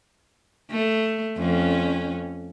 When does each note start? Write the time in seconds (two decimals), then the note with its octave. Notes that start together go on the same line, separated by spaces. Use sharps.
0.71 A3
1.37 F2 C#4